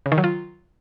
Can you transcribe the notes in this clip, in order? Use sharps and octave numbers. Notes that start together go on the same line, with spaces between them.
C#3
D#3
F#3
F4